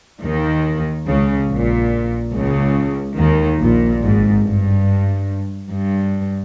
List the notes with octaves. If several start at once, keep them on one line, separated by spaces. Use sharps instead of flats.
D#2 D#3
C#2 C#3
A#1 A#2
C#2 C#3
D#2 D#3
A#1 A#2
G#1 G#2
G2
G2